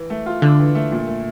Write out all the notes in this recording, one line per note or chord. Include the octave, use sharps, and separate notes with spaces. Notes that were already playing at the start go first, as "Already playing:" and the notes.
Already playing: E3
A3
F4
D3 D4
E3
A3
A#2
A3